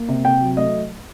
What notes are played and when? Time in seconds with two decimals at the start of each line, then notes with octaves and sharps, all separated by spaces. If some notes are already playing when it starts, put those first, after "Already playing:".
Already playing: A#3
0.08 C3
0.25 C3 G5
0.41 F#3
0.57 A3 D#5